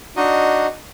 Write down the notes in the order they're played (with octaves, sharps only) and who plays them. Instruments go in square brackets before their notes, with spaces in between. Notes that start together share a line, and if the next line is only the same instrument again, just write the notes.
[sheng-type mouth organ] D4 D#4 F#4 D#5